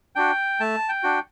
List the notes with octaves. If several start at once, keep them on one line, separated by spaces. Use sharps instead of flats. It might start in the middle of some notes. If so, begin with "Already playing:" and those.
D4 F#4 G5
A3 A5
G5
D4 F#4